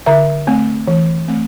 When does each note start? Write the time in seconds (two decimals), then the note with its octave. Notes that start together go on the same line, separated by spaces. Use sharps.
0.06 D3 E5
0.47 A3 C4
0.88 E3
1.28 A3 C4